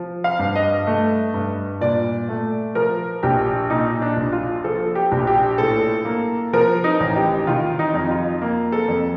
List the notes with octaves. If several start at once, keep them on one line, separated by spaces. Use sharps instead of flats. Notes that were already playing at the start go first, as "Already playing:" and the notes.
Already playing: F3
F5
G2
D#5
A3
G2
A#2 D5
A3
F3 A#4
A#1 G4
A#2 D#4
D4
A#1
F4
F3 A4
G4
A#1
G4
A2 A4
A#3
F3 A#4
D#4
A1
G4
D#3 F4
D#4
F2
F4
A#3
A4
F2